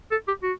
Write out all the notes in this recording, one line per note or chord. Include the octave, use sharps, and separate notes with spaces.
A4
G4
F#4